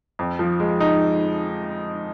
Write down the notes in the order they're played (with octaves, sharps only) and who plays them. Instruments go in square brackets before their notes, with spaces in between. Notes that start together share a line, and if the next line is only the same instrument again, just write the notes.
[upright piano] F2
F3
G#3
D#4